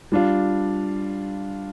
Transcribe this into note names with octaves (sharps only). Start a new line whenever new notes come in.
G3 D4 F4